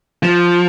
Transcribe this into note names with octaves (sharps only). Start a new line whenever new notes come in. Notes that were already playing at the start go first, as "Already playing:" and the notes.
F3